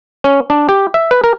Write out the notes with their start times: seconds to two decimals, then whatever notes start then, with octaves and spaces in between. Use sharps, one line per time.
0.24 C#4
0.50 D4
0.69 G4
0.94 E5
1.11 B4
1.24 A#4